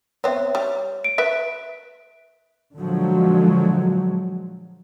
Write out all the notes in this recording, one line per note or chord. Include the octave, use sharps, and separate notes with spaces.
B3 C4 C#5 E5
G3
D7
B4 E5
A#2 D3 F3 F#3 G#3